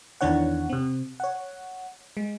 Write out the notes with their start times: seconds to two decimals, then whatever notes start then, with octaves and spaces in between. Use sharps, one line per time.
0.21 E2 D#3 E3 D4 C#5 F#5
0.70 C3 C4
1.20 C#5 F#5
2.17 G#3